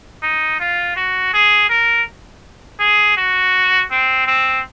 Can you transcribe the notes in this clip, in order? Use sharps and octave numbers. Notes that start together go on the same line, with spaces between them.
D#4
F4
F#4
G#4
A#4
G#4
F#4
C4
C4